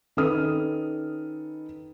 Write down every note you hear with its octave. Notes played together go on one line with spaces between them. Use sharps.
D#3 C#4 A4 B4 D#6 F6